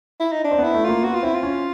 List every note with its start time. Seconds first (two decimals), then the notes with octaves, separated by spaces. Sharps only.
0.20 E4
0.32 D#4
0.44 D4
0.51 C4
0.58 B3
0.64 E4
0.74 A3
0.84 A#3 F4
1.03 B3 F#4
1.14 F4
1.23 C4 E4
1.34 F4
1.43 C#4